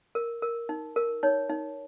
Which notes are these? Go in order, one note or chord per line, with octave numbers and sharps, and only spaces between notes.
A#4
A#4
D#4
A#4
D#4 C#5
D#4